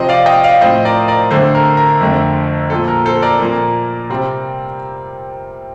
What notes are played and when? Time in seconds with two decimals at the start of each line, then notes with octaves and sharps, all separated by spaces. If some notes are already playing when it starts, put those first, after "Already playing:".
Already playing: C3 F3 C4 C5 D#5
0.09 D5 F5
0.26 D#5 G5
0.44 D5 F5
0.61 A2 F3 C4 C5 D#5
0.85 A#4 D5
1.08 A#4 D5
1.31 D3 A3 C4 A4 C5
1.55 A#4
1.77 A#4
2.01 F2 D3 A3 C4
2.70 A#2 F3 C4 A4
2.88 A#4
3.05 A4 C5
3.22 A#4 D5
3.40 A#2 F3 A#3
4.10 C3 G3 C4